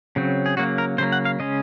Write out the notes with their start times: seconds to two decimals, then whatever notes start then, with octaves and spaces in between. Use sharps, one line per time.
0.16 C#3 F#3 C4
0.46 G#4
0.57 C#3 F#3 A#3 F#4
0.78 A#4
0.98 C#3 F#3 A#3 C5
1.12 F#5
1.25 F5
1.40 C#3 G#3 C#4 D#5